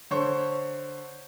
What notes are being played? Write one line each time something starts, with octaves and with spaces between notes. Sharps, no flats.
D3 C5 C#5